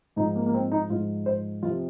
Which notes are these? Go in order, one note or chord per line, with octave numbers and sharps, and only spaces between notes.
G#2 F3 D#4
A#3
A#3
C4
D#4
G#2 F3 F4
C5
F2 C3 F3 F4